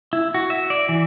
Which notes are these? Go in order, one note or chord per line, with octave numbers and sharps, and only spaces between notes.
E4
F#4
E5
D5
E3